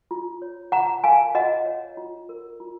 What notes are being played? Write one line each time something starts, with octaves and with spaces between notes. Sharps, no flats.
F4
C#5
F4 F#5 A#5
A#4 F5 G#5
F4 D#5 F#5
C#5
F4
A#4
F4